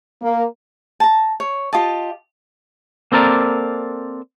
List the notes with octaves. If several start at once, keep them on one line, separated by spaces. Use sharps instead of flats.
A#3
A5 A#5
C#5
F4 G4 D#5 A5
A#3 C4 A4 A#4 D5